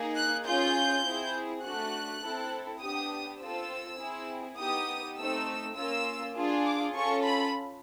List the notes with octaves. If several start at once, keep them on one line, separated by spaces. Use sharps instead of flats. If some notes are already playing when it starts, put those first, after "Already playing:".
Already playing: A#3 D#4 G#4
F#6
C#4 F4 G#4 G6
C4 E4 G#4
A3 D4 F#4 F#6
C4 E4 A4
B3 D4 G4 D#6
C4 F4 A4 E6
C4 E4 G#4
B3 D#4 G4 D#6
A3 C4 D#4 E6
A#3 C#4 F4 E6
D4 F4 G#4
D6
C#4 F4 A4 C#6
B5